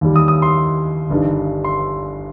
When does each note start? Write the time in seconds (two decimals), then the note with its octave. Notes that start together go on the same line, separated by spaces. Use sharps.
0.01 D#2 D#3 G3
0.16 D#6
0.28 D#6
0.42 C6
1.10 G1 G2 D#3 G3
1.64 C6